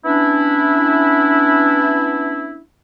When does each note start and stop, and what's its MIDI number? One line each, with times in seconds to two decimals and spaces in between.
0.05 2.59 59
0.05 2.59 61
0.05 2.59 62
0.05 2.59 64